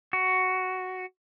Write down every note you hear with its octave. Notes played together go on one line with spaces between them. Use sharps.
F#4